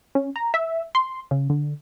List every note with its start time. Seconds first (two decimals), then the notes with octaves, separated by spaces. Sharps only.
0.15 C#4
0.36 A#5
0.54 E5
0.95 C6
1.31 C#3
1.50 D3